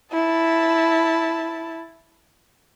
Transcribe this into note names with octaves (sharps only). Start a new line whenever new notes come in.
E4 A5